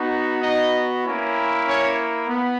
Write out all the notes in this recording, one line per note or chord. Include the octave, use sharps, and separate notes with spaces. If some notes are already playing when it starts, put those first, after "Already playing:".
Already playing: B3 D#4 F#4
D#4 D#5
A#3 C#4 E4
C#4 C#5
B3